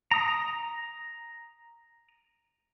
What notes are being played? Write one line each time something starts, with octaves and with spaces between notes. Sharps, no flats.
A#5 D#6